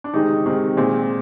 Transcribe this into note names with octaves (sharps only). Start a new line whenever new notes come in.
D4
C3 D#3 G#3 C4 D#4
C3 D#3 G#3 C4
A#2 G#3 C4